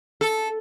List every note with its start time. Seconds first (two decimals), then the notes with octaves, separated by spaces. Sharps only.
0.21 A4